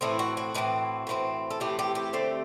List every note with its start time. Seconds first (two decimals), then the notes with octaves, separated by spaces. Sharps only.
0.01 A2 E3 A3 C4 E4
0.19 F#4
0.37 F#4
0.54 A2 E3 A3 C4
1.07 A2 E3 A3 C4
1.50 A4
1.60 A2 E3 A3 C4 G4
1.79 G4
1.95 G4
2.13 D3 A3 C4